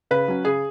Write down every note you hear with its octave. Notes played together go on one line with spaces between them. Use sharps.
C#3 B4
F#3 C#4
C#3 G#4